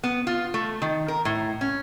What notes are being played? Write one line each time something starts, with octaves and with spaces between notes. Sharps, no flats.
B3
F4
A3
D#3
A#4
A2
C#4